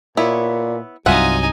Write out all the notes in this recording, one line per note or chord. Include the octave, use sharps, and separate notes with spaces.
A#2 B3 E4 C#5
C2 G2 F#3 D#4 F4 E5 F#5 G#5